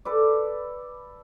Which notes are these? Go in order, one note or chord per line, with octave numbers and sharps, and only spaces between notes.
A4 B4 D5